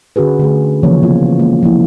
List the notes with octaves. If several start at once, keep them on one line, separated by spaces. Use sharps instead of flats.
D3 C#4 F#4 G#4 B4
D3 A3 G#4
C#3 E3 F3 A#3 C#4 C#5
C3 A#3 B3 F4
G#3 A#3
F3 A#3 E4